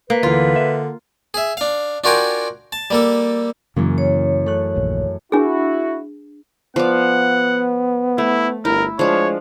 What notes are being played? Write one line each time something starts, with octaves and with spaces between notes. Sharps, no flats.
A#3 B4
D2 D3 E3 F4
E5
G#4 E5
D4 F5
D4 F4 F#4 A#4 G5 G#5
A5
G3 A#3 A4
F#2 C#3 E3 A#3
C#5
A3 F#6
A#1 D#2
D4 E4 F#4 G#4
F3 B3 D5 F#5
A3 E4
G1 E4 A#4
F3 G#3 D4 C#5